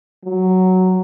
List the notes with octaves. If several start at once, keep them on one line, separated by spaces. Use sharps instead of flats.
F#3